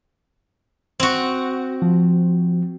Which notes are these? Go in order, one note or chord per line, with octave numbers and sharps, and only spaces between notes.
C4 F#4
F3